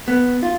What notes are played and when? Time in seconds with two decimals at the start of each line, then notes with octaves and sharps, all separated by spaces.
0.08 B3
0.43 F4